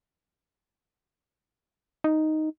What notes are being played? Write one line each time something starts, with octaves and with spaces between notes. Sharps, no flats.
D#4